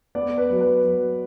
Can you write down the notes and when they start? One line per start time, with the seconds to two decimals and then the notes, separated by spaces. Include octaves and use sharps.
0.15 B3 D5
0.38 B4
0.50 F#3
0.61 B4
0.85 F#3